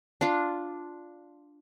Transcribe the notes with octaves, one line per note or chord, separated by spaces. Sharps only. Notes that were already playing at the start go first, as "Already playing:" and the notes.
D4 F4